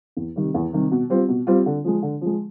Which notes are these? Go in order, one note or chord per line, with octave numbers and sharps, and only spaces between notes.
E2
C3 D#3 G3
E2
C3 D#3 G3
B2
G3 C4 F4
B2
G3 C4 F4
D3
F3 G#3
D3
F3 G#3